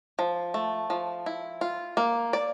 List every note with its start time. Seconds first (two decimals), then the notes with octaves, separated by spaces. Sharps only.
0.19 F3
0.54 A3
0.90 F3
1.26 E4
1.61 F4
1.97 A#3
2.33 D5